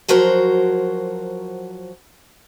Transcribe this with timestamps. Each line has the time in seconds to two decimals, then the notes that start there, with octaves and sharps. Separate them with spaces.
0.08 F3 F#3 F#4 A#4 C5